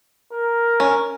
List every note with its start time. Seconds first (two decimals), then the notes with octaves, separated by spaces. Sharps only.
0.33 A#4
0.80 C#4